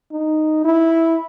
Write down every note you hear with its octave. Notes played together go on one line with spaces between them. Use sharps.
D#4
E4